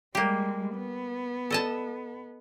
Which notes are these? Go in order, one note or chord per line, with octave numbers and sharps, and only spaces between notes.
G3 G#3 A#3 G4
B3
A4 D#5 A5